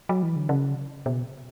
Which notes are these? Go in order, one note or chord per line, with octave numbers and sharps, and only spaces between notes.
F#3
E3
D3
C#3
B2